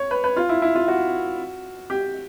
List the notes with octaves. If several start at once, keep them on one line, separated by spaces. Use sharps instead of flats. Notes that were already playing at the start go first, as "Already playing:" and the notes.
Already playing: C#5
B4
B4
F4
E4
E4
F4
F#4
G4